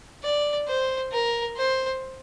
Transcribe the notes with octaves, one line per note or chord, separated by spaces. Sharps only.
D5
C5
A#4
C5